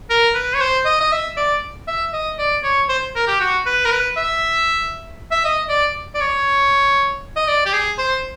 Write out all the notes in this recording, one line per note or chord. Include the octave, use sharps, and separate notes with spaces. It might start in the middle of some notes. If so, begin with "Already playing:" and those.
A#4
B4
C#5
C5
D#5
D#5
E5
D5
E5
D#5
D5
C#5
C5
A#4
G4
F#4
B4
A#4
B4
E5
E5
D#5
D5
D5
C#5
D#5
D5
G4
G#4
C5